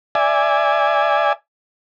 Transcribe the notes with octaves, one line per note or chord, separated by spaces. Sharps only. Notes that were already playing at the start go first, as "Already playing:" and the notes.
D5 E5 G#5